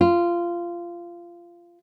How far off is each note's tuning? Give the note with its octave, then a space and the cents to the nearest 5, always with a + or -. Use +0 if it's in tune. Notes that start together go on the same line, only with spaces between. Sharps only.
F4 -15